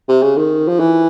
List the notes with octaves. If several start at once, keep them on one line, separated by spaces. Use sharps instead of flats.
C3
C#3
D#3
F3
E3